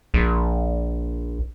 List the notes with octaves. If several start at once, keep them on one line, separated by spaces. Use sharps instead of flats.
A#1